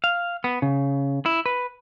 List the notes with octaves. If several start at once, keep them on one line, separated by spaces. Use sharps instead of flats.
F5
B3
C#3
E4
B4